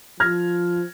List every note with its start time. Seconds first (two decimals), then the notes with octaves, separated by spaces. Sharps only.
0.20 F3 F6 G#6 A#6